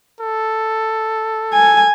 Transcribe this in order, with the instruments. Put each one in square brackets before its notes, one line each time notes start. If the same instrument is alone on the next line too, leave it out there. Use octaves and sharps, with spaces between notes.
[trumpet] A4
[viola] G#5